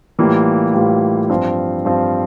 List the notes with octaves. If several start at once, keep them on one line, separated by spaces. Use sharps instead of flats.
A2 E3 G3 A#3 F4
A2 E3 G3 A#3 F4
G2 F3 C4 F4
G2 F3 C4 F4